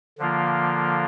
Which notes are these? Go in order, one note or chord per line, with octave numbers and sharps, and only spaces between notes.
D3 F3 A#3 F4